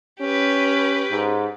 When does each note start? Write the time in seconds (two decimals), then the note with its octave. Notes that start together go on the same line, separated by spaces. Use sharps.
0.21 C#4 G4 B4
1.11 G#2